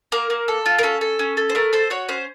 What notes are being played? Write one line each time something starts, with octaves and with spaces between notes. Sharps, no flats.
A#3 A#4
A#3
A4
F4
A#4
C#4 A4
A4
C#4
A4
C5
A3 A#4
A4 C5
F#4 C#5
C#4 C5